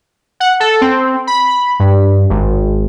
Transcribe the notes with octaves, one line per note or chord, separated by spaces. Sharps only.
F#5
A4
C4
B5
G2
G#1